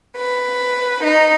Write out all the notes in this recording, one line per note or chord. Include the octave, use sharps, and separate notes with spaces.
B4
D#4